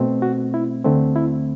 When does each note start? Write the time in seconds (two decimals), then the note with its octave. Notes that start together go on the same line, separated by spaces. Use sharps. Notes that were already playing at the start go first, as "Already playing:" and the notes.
Already playing: B2 A3 C4
0.22 F#4
0.54 E4
0.84 D2 D3 A3 C4
1.16 E4